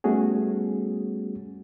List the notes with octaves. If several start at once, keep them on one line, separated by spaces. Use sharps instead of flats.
G3 A3 B3 C#4 F#4 G#4